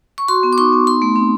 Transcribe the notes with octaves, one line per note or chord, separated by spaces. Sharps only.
C#6
F#4 C6
B3
D6
D#4 C#6
B3
D#4 C6
A3
C4